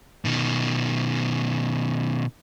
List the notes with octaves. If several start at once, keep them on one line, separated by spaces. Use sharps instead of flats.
B2 D#3